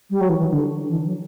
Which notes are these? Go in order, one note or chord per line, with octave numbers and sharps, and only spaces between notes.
G3
F#3
E3
E3
D3
E3
F#3